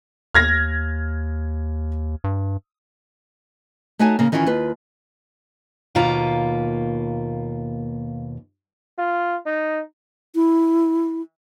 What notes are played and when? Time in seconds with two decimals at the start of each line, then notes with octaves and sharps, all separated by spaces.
0.35 D#2 F6 G#6 A#6
2.24 G2
3.99 A3 D#4 F#4 C#5 G#5 A5
4.19 C#3 A#3
4.32 D#3 E3 C#4 E4 F4
4.46 D#2 F4 B4
5.95 D#2 B2 A#3 F4 B4 A#5
8.98 F4
9.46 D#4
10.35 E4